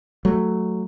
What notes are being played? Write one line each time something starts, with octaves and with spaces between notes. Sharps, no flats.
F#3 A3